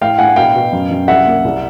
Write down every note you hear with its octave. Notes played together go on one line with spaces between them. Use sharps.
A2 F5 G5
A2 F#5 G#5
B2 F5 G5
B2
F#2
F#2
C2 E5 F#5
A#3
C2